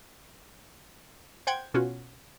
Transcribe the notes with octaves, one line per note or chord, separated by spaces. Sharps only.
C5 F#5 G5 G#6
B2 C#4 F4 F#4